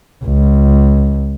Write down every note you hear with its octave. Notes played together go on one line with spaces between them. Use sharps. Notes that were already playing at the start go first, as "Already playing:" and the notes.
C#2